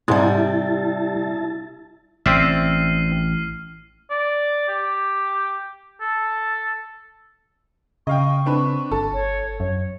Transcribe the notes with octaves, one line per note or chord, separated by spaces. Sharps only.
G#2 C3 G3 G#3 E4 A5
A1 C4 D5 E5 F6 C7 D#7
D5
G4
A4
C#3 D#5 F5 G5 C#6
C4 D4 B4
G1 A4
C#5
F#2 C#5